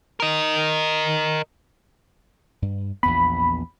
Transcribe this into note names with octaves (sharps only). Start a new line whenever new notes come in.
A#4 D#5
G2
A#1 E2 B3 B5